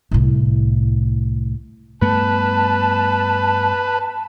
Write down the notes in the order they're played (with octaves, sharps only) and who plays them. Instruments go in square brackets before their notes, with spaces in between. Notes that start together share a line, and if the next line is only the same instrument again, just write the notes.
[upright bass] C2 A2
[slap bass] G2 A3 B3 [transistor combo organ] B4 [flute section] A5